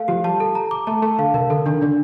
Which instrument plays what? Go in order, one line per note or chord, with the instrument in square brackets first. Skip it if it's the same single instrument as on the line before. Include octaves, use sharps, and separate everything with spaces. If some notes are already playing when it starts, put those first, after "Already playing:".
Already playing: [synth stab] A3 [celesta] F5
[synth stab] F3 [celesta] G4
[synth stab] G3 [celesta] A5
[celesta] A4
A#5
D6
[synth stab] A3 [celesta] A5
[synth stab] A3 [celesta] A5
[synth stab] D3 [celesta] F5
[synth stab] C3 [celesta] A#4
[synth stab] D3 [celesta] A4
[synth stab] D#3 [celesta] D4
[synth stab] D3 [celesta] D4